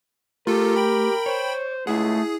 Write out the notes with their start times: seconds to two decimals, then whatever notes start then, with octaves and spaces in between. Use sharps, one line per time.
0.47 A3 F4 G4 A4 A#4
0.76 G5 B5
1.26 C5 C#5
1.87 C#2 A3 E4 G#4 F#5